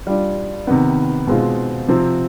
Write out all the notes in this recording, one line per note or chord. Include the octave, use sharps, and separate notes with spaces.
G3 D4 F4
C3 D#3 B3
B2 G#3 C4 F4
C3 F3 C4